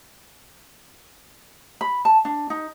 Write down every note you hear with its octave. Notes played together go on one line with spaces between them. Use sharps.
B5
A5
D4
D#4